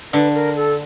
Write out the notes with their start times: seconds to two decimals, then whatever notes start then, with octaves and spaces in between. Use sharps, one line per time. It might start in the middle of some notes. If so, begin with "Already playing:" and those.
0.13 D3 B4
0.34 A#4
0.56 A4